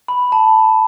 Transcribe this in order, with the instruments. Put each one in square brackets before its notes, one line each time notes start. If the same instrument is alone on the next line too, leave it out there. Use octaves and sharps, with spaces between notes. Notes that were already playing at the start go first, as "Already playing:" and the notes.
[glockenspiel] B5
A5